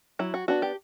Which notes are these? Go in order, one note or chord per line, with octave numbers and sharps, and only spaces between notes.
F#3 E4
F#4
B3 D4 F#4
G4